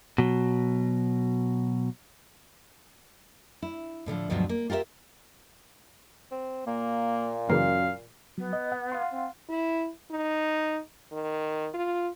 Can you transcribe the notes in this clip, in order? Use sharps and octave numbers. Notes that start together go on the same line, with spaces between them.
B2 F#3
E4
A2 D3 E3 F3
D2 G2 B2 F3 F#3
A#3
F4 G4 A#4 C#5 E5
C4
A#2 A#3
F#2 C#3 E3 A#3 F5
F#3 B3
D#5
F#5
F5 F#5 C6
C4
E4
D#4
D#3
F4